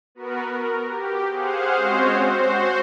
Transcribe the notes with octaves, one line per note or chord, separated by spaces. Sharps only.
B3 F#4 A#4 B4
A#4
G4
G#4 C5 F5 F#5
G#3 C4 C#4 F#4 C5 C#5
F#4 C5